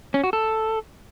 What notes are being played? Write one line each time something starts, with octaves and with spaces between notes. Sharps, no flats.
C#4
F#4
A4